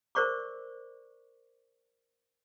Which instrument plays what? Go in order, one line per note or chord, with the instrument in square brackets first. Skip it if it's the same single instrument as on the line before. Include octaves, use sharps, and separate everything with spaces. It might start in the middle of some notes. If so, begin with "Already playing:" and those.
[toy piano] A#4 C5 D5 C#6 D6